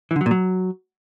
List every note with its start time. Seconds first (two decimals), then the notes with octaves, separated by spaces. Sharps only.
0.11 E3
0.16 D3
0.21 F#3
0.26 A#2
0.31 F#3